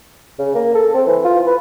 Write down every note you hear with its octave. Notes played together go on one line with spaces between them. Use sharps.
C#3
A#3
A4
C4
E3
F4
B4